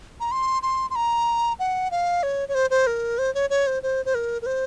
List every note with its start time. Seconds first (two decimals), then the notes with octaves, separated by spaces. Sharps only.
0.20 A#5
0.31 C6
0.63 C6
0.90 C6
0.96 A#5
1.59 F#5
1.91 F5
2.23 C#5
2.49 C#5
2.55 C5
2.70 C5
2.87 A#4
3.18 C5
3.35 C#5
3.50 C#5
3.67 C5
3.83 C5
4.05 C5
4.15 A#4
4.42 A#4
4.46 C5